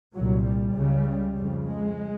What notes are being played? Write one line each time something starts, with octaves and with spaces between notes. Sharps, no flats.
C2 A#2 F#3
G3
C#2 C#3
F2 C#3
G#3